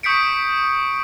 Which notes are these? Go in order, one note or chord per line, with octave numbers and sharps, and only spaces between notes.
C#6 D#6 G6 B6 C#7 D7